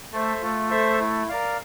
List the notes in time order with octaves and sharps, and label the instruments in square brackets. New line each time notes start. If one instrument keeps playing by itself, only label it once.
[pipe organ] A3 [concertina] A4 C5 E5
[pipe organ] A3 [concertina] F4
[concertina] A4 C5 E5
E4
A#4 D5 F5